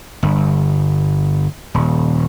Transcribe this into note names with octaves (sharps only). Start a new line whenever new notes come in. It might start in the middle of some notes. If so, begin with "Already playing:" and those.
G1
D#1